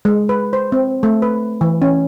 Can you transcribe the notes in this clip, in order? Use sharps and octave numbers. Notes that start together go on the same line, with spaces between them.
G#3
B4
C5
C4
A3
B4
E3
C#4